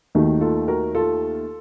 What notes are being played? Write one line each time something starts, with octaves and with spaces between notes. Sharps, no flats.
D#2 D#3 A3 D#4 F#4
F4 A4
F#4 A#4
F4 A4